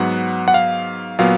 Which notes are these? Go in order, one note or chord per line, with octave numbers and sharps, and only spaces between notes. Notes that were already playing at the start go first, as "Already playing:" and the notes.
Already playing: G#2 F#3 B3 F#5
F#5
F5
A#2 F#3 B3 F5